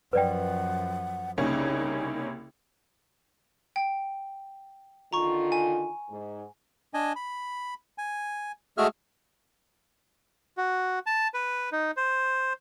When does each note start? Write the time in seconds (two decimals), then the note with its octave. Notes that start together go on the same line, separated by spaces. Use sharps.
0.13 F#2 F3 B4 D5 F#5 G5
1.38 C2 C#3 A#3 C#4 D#4
3.76 G5
5.13 D3 D#3 F4 A#5 C#6
5.52 G#5
6.11 G#2
6.94 D4 D#5 G#5
7.16 B5
7.98 G#5
8.78 G#3 A3 F#4 G#4 E5 F6
10.57 F#4
11.06 A5
11.34 B4
11.72 D#4
11.97 C5